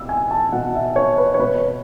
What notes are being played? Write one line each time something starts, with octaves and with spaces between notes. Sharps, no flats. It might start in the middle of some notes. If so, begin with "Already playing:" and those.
Already playing: B2 E6
G#5
A5
B2 F#5
E5
C#5
B4
C#5
B2 B4